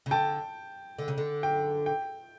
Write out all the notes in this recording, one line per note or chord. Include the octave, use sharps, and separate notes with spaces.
C#3
D3 G5 A5
D3
C#3
D3
G5
G5